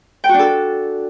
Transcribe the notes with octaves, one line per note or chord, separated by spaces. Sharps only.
G5
F#4
D4
A4